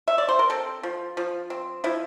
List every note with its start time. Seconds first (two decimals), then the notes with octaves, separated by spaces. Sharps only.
0.08 E5
0.18 D5
0.29 C5
0.39 A#4
0.50 C4 A4
0.83 F3
1.17 F3
1.50 C4
1.84 F3 E4